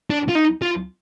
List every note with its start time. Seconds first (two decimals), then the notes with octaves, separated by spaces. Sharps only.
0.10 D4
0.29 F4
0.35 D#4
0.62 F4